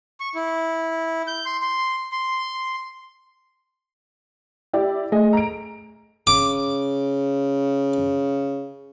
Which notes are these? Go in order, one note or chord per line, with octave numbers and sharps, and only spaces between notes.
C#6
E4
G6
C6
C6
C6
E4 G4 D5
A3 G#4 D#5
A#5 D7
C#3 D6